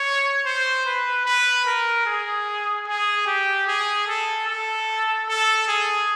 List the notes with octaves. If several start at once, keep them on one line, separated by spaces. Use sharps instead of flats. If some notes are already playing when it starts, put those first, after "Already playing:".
Already playing: C#5
C5
B4
B4
A#4
G#4
G#4
G4
G#4
A4
A4
A4
G#4